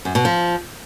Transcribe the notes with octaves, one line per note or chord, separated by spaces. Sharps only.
F#2
B2
F3